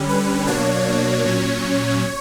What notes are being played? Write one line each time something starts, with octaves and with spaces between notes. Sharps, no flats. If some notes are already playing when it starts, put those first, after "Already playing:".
Already playing: D3 G3 C#4
B4
B2 F#3 A#3 D4 C#5
A#2 F#3 C#4